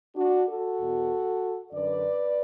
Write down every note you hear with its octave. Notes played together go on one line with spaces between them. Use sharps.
D4 F#4
F#4 A4
E2 B2
F#2 D3 B4 D5